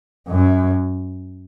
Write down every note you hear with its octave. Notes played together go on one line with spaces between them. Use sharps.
F#2